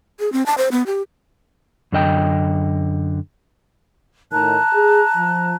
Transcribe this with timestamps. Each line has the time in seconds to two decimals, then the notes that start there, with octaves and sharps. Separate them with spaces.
0.20 G#4
0.33 C4
0.46 A5
0.58 C5
0.72 B3
0.87 G4
1.92 F#2 D3 D#5 G5
4.32 A2 D#3 A5 A#5 F#6
4.72 G#4
5.16 F3